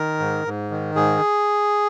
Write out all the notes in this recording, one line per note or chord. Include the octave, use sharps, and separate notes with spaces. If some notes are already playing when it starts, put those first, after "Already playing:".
Already playing: D#3 A#4
G#2
G#2
D#3
G#2 G#4